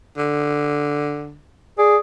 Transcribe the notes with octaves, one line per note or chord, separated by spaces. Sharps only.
D3
G#4 D5